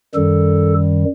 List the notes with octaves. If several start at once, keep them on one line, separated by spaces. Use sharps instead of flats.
F#2 D#3 G3 A4